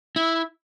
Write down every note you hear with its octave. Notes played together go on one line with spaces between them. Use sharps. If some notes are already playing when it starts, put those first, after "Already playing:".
E4